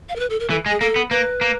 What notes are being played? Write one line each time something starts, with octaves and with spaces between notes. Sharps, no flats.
F5
A#4
B4
A4
A#4
E3 A4
G#3
G#4
A#3 A4
B3
A#3 B4
A#3